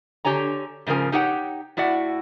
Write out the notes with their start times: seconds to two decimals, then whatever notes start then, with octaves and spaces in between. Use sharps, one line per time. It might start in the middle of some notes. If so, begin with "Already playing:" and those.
0.25 D3 G4 C#5 G#5 A#5
0.87 G#2 C#3 F3 A#4 G#5
1.12 D#4 G4 C#5 F#5 G5
1.77 A2 E4 F#4 D5 F#5